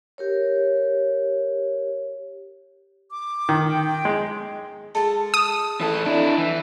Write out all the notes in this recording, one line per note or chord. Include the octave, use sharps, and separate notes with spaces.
G4 A#4 C#5
D6
D#3
G5
G#3
G#3 F4 A4 A5
D#6
E3 A4
D4 E4
E3